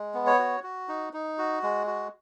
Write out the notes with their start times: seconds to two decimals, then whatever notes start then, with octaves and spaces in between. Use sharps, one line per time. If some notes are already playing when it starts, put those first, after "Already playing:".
Already playing: G#3
0.14 B3
0.26 C#5
0.39 F#4
0.63 F#4
0.89 D#4
1.13 D#4
1.38 F#4
1.63 G#3
1.87 F#4